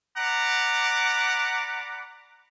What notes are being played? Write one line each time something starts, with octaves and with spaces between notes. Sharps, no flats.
D5 F#5 A#5 B5 D6